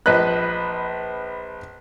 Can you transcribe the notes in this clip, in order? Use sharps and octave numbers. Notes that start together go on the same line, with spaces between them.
A#1 B4 D#5 B5 F#6